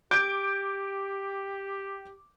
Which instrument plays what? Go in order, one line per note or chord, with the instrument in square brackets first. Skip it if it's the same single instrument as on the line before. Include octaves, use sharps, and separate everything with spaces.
[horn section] G4 [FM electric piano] D6 [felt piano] G6 D7